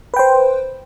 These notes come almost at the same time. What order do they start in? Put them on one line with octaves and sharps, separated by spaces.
B4 G5 C5